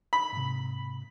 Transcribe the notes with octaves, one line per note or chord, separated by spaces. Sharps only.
B5
G#2 C3